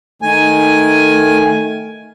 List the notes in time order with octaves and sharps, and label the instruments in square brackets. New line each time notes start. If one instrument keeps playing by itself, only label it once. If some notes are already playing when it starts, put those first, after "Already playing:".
[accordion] D#3 G#5 [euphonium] A3